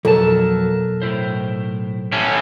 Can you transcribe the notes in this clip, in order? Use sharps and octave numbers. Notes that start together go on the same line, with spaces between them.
B1 F2 F#3 A4 A#4 A5
A2 E4 C5
A2 C#4